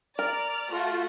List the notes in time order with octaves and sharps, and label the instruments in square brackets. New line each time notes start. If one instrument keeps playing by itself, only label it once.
[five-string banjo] A#4 [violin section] D5 F6
[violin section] A3 F#4 [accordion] F4